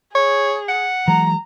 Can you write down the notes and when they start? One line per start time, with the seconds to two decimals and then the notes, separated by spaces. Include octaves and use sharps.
0.15 G#4 C#5
0.69 F#5
1.08 E3 F#3 G#3 A#5